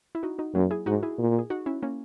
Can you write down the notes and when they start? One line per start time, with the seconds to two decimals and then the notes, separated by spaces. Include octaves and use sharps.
0.15 E4
0.23 D#4 F#4
0.38 D#4 F#4
0.55 F#2 F#3 A#3
0.71 E4 G#4
0.86 G#2 D#4 F#4
1.03 E4 G#4
1.19 A#2
1.39 G#4
1.50 D#4 F#4
1.66 C#4 E4
1.83 A#3 C#4